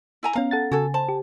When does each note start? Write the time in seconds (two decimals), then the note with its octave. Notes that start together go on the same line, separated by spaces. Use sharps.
0.23 E4 G#5 A#5
0.36 B3 C#4 F5 A#5
0.51 A4 F#5 A6
0.72 C#3 F#4 A4 G#5
0.94 C5 A5
1.09 G4